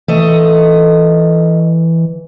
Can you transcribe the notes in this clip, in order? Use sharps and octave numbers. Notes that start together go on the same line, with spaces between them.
E3 A3 D#5